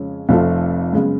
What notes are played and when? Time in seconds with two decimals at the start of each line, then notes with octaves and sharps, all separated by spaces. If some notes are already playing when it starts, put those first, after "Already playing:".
Already playing: F2 C#3 G#3 C#4
0.29 F1 F2 F3 A3 F4
0.93 F#2 C#3 G#3 B3